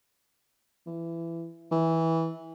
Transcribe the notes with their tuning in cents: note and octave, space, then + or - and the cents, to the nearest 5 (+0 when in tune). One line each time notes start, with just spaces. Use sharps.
E3 +20
E3 -15